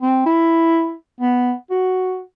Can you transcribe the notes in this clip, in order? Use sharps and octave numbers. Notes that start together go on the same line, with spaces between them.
C4
E4
B3
F#4